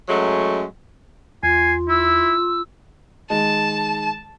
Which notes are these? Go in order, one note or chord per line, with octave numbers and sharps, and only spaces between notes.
F#2 F#3 G#3 A3
E2 F4 G#5 C7
E4 E6
D#3 G#3 A5